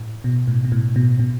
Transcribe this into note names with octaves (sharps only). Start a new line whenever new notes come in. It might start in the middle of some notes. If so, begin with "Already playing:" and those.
Already playing: A2
B2
A2
B2
A2
B2
B2